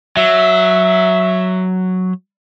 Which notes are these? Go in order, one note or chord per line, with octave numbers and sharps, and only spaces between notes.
F#3 E5